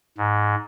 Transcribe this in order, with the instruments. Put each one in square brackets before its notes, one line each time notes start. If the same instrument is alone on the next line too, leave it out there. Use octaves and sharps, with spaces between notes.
[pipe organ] G#2